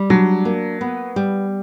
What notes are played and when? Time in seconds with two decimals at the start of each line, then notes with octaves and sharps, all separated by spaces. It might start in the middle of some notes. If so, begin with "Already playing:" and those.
Already playing: G3
0.10 F#3 D4
0.45 A#3
0.81 B3
1.16 G3